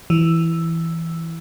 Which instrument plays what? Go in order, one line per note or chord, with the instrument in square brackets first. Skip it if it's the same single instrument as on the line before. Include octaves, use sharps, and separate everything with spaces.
[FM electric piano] E3